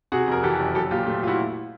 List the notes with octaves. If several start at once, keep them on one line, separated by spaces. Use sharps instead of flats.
C3 F#4 G#4
F2 A#4
E3 G4 A4
F#1
F#3 G4 A4
A#2 F4 G4
A3
F4
E4 F#4